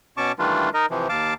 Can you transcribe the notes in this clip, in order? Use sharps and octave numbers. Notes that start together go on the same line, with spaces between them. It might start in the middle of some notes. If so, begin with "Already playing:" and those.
B2 C#4 A5 C#6 D6
D#3 E3 G3 A3 D4 F4
D#4 A#4 D#5
C3 E3 F3
D#2 F5 A5 D6